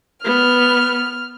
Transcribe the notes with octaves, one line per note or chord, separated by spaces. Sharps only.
B3 F6